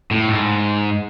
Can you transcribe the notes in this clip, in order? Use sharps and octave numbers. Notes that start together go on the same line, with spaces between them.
A2
G#2